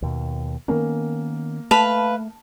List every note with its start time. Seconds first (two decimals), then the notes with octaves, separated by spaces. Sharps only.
0.02 D#2 B2
0.68 D#3 A#3 B3 C#4
1.71 A3 B4 F5 A5 B5